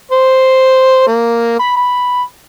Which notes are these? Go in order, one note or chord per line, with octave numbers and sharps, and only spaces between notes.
C5
A#3
B5
B5